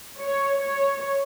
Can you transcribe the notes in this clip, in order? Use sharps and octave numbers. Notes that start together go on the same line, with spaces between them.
C#5
C#5